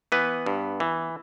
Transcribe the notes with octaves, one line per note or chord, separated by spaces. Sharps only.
E3 B3 B4
G2
E3